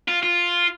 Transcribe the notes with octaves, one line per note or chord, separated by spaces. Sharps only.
F4
F4